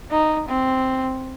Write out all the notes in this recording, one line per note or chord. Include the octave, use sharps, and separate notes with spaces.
D#4
C4